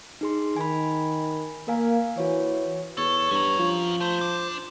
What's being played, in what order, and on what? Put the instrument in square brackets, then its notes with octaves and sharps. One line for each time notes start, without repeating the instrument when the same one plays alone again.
[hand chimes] D#4 G#4 C6
[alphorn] D#3 [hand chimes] G#5 B5
[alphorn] A#3 [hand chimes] A#4 F5 G#5
[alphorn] E3 [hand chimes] F#4 C#5
[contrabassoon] E2 [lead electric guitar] A4 [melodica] C#5
[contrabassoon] G2 [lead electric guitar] C#4 A#5
[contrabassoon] F3
[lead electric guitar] A3 [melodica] C5
[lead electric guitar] D4